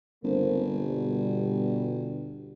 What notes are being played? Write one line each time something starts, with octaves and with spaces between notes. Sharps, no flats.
G1 C#2 A#3 C4
B2 G3